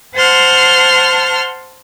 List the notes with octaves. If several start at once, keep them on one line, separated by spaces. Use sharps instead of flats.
C5 F#5 A5 C6 F6